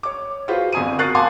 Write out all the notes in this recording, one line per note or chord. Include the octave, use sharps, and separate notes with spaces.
C#5 D6
F4 F#4 G#4 B4 C5
G1 C4 G#5 D#6 D#7
F#4 A#4 C#6 F#6 A6 C7
F5 F#5 G#5 A5 C6 D6